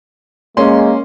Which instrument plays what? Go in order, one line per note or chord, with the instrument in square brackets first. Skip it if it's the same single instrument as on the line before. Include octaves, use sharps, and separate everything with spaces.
[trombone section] G#3 A#3 [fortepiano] C#4 C6